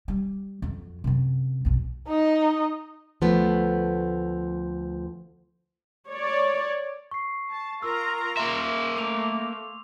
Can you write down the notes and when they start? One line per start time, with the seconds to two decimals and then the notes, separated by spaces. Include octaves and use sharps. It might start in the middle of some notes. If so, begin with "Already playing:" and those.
0.08 G3
0.62 F2 F#3
1.04 F#2 C3
1.65 B1 F#2
2.08 D#4 D#5
3.21 D2 F3 A3 B3
6.09 C#5 D5
7.11 C#6 C7
7.50 A5
7.82 F4 A#4 A#5 E6
8.37 A#3 E5 C6
8.97 A3 D6 F7